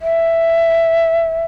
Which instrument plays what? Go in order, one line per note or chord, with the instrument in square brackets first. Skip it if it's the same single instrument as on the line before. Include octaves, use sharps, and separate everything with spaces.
[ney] E5